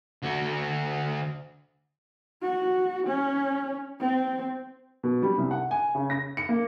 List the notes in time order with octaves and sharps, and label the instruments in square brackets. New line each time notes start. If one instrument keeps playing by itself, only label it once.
[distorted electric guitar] D3 F#4
[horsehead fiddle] F#4
C#4
C4
[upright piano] B2
G3
C2
F#5
G#5
C#3
A#6
C#7
A#3